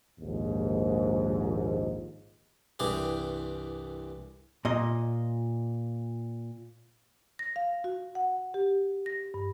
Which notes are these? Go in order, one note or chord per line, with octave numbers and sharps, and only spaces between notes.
A#1 D#2 G#2
C2 G2 E3 G4 G#4
A#2 D#5
A#6
F5
F#4
F#5
G4
A#6
G2